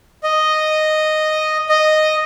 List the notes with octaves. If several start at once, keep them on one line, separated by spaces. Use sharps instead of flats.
D#5
D#5